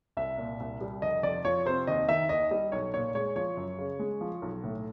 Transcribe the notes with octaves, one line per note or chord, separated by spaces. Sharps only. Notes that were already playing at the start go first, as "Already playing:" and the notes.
C2 E5
A#2
C2
G3
F1 D#5
F2 D5
F3 C#5
C3 C5
D#2 D#5
D#3 E5
D#2 D#5
G3 D#5
B1 C#5
A#2 C#5
G#3 C#5
F3 C#5
F#2
C#3
G#3
F3
B1
A2